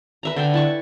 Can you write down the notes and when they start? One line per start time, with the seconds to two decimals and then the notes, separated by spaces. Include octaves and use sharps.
0.23 B4 E5 A#5
0.36 D3 E5 G5
0.54 E4 A5 C#6